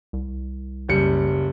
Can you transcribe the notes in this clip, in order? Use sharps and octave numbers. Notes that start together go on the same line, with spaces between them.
C2
F#1 G3 C#7